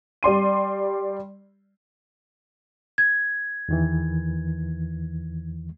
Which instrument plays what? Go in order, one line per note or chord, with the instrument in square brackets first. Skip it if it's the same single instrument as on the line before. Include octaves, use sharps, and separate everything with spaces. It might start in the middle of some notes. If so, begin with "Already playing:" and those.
[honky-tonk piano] G3 D5 C6 D#7
[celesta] G#6
[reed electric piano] E2 D#3 E3